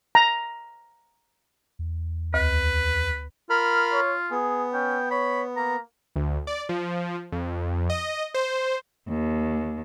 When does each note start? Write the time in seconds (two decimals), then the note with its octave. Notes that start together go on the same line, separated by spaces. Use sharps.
0.15 A#5
1.79 E2
2.34 D2 B4
3.50 F4 A#4 B5 F6
3.92 C#5
4.31 B3 G#4
4.73 C#4 G5
5.11 C#5 B5
5.57 A#3 A#5
6.16 D2
6.47 D5
6.69 F3
7.32 F2
7.90 D#5
8.34 C5
9.08 D#2